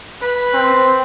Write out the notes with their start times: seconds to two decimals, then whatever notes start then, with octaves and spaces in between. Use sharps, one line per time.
0.21 B4
0.54 C4